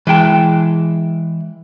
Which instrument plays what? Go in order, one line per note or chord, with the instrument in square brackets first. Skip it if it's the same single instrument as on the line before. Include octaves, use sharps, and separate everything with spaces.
[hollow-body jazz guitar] E3 G#3 G5 A5